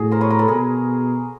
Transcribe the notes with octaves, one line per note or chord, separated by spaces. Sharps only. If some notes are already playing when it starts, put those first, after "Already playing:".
Already playing: A2 F#4 G#4
A#4 C5
B4 C#5
A#4 C5
A4 B4
B2 G#4 A#4